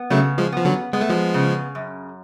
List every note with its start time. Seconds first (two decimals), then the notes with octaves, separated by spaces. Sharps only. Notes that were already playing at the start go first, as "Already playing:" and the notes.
Already playing: B3
0.10 C#3 F#3 A3
0.38 F3 G#3
0.52 B3
0.58 F3
0.65 D3 F#3
0.93 G#3 B3
1.01 A3
1.09 F3 G#3
1.34 C#3
1.75 F#2